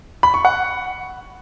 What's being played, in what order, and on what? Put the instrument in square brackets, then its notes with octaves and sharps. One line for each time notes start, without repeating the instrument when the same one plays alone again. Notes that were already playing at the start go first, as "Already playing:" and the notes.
[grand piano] B5
C#6
F#5